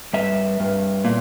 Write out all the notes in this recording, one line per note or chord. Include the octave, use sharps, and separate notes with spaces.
G2 E5
G2
A#2